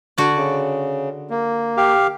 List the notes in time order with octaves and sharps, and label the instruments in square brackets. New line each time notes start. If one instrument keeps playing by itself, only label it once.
[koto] D3 F#4 D5
[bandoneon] C#3
A#3
[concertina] G4 F5